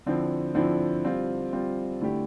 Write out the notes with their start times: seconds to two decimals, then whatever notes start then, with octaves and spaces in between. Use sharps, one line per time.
0.06 D3 F3 C4 E4
0.55 D3 F3 C4 E4
1.04 G3 C4 F4
1.52 G3 C4 F4
2.01 D3 A3 E4 G4